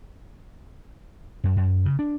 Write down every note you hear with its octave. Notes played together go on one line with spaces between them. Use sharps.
F#2
F#2
C#3
D4